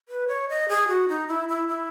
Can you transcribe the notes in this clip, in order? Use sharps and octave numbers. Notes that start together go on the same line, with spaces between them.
B4
C#5
D#5
G#4
F#4
D#4
E4
E4
E4